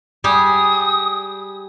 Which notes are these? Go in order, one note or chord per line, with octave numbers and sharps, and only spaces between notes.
G3 G4 G#4 D#6